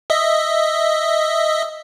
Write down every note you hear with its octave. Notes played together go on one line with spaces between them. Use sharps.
D#5 E5